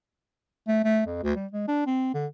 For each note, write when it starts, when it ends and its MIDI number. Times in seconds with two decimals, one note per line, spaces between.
0.68 0.84 57
0.84 1.02 57
1.07 1.21 41
1.23 1.36 38
1.36 1.46 55
1.53 1.67 56
1.68 1.86 62
1.86 2.12 60
2.14 2.26 50